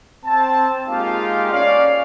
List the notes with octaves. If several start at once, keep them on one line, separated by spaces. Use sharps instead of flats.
C4 A5
G#3 A#3 D#4 F4 G4 F5
C#4 D5 F5